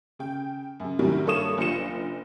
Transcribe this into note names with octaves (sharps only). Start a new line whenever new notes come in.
C#3 G5
F#2 C#3
F#2 A2 C3 D#3 F#3 G3
G2 A#3 A4 C#5 D#6 E7
F#1 D4 F4 C#7 E7